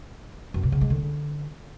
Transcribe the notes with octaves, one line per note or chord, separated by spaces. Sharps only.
F#2
B2
C#3
G#3
D3